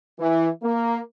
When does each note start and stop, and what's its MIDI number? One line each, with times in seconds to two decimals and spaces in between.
0.20 0.49 52
0.63 1.00 58